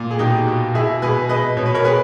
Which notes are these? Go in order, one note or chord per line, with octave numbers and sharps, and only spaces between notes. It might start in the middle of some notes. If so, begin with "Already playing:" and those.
Already playing: A#2
G#4
B2 D#4 G4
B2
B2 E4 G#4
B2 G#4 B4
B2 B4 D#5
B2 C#5
B4
A#4 C#5
B2 G#4 B4